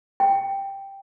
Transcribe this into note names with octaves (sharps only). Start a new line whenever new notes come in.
G5